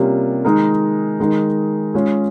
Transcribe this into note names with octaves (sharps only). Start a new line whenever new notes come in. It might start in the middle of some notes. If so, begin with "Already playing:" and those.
Already playing: C3 G3 A#3 C#4 F4
D#3 G#3 D#4 A#4
D#3 G#3 D#4 A#4
G#3 C#4 F4 G#4